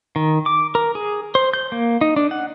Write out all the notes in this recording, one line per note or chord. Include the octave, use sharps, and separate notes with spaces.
D#3
D6
A#4
G#4
C5
G6
A#3
D#4
D4
F#5